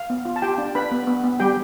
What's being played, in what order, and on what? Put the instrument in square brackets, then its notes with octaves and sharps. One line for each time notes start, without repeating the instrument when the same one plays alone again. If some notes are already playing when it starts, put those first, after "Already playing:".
Already playing: [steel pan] F5
B3
F4
A5
F4 G4 G5
D4
D4 B4 B5
B3
B3
B3
G3 G4 G5